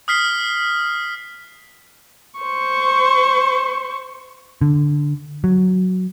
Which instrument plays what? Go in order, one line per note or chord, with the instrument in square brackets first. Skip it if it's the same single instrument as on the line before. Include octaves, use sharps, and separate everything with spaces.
[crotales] D#6 F6 B6 C7 G7
[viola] C5 C#6
[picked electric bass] D3
F#3